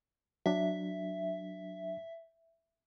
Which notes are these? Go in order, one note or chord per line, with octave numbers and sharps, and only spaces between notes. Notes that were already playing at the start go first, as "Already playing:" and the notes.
F#3 D4 E5